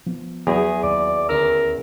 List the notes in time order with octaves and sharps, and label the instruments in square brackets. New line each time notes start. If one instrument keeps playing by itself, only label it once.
[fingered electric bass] F3 B3
[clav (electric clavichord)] E2 [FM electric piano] F#3 [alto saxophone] G#4
[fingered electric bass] D#2 [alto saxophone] D5
[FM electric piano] D2 C#4 E6 [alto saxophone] A#4